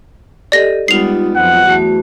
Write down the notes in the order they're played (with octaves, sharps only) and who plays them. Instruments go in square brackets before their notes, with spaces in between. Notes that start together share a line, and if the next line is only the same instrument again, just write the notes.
[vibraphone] G4 A4 D#5 [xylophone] D5 A#6
[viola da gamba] G3 G#3 B3 [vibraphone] D#4 F4 [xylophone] C7 F7
[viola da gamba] F2 F#3 B3 [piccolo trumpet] F#5
[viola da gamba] E2 [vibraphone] A3 F#4